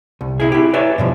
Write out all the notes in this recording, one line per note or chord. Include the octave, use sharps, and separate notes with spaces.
C2
C3 E4 G#4
E4 G4
B4 C#5 D5 E5 G#5
G2 B2 F3